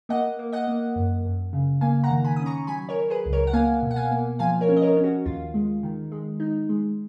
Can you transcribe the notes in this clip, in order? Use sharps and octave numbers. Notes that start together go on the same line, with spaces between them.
A#3 D#5 F#5
A#3
D#5 F#5
A#3
F#2
F#2
C#3
A#3 F5 G#5
F#5 A#5
D#3
G#5 B5
C#4 D#6
A#5 C#6
F#3 G#5 B5
A#4 C#5
F#3
G#4 B4
C#2
A#4 C#5
F#5
A#3 F5 G#5
B2
F#5
F5 G#5
A#3
F3 F5 G#5
A#4 C#5
C#4
D#5
A#4 C#5
C#4
F#4
D#2 F4
G#3
D#3
G#3
D#4
G#3